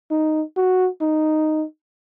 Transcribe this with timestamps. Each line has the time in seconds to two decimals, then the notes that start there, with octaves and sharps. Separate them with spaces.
0.11 D#4
0.57 F#4
1.01 D#4